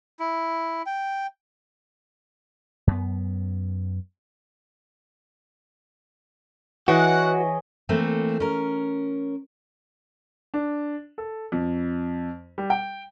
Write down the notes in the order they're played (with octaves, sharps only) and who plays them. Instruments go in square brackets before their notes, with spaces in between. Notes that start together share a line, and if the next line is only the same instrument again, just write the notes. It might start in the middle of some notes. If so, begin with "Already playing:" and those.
[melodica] E4
G5
[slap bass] F#2 B3
[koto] E3 [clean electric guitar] F#4 [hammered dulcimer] G#4 C#5 D#5 [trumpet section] F#5
[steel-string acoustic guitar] E3 A3 A#3 C4
C#4 A#4
[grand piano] D4
A4
F2
G3
G5